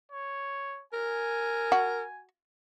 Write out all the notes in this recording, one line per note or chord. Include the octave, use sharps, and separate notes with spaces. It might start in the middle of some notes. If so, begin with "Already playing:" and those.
C#5
A#4 G#5
F#4